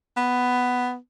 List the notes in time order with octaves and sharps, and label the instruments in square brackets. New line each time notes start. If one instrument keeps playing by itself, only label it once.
[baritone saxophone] B3